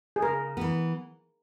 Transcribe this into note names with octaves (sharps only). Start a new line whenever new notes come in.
G#4
C#3 A#4
E3 B3